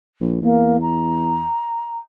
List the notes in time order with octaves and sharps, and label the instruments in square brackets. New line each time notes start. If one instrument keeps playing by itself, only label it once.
[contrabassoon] A#1
[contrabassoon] E2 [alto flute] A#3
[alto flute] A#5